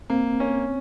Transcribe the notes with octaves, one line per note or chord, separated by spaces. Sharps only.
A#3 C4
C#4